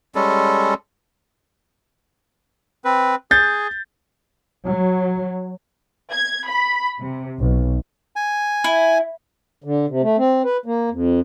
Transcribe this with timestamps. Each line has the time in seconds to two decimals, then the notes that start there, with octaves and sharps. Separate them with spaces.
0.15 G3 G#3 C#4 A4
2.85 C4 B4
3.31 G#4 G6 A6
4.65 F#3
6.11 G#6
6.47 B5
7.01 C3
7.39 B1
8.16 G#5
8.64 E4
9.64 D3
9.88 C3
10.02 A3
10.18 C4
10.44 B4
10.66 A#3
10.90 F2